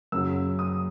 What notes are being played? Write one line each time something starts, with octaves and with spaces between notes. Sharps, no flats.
F#2 C#3 F#3 E6
D#6